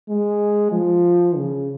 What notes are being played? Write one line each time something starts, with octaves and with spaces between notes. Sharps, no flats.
G#3
F3
C#3